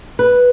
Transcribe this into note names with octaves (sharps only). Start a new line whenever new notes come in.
B4